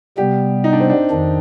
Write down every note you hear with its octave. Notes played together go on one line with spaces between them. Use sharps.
C3 G3 B3 G4
D#4
D4
C4
D4
F2 D#3 D4